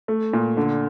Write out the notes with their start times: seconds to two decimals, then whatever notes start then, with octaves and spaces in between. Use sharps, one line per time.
0.08 A3
0.33 A#2
0.57 D3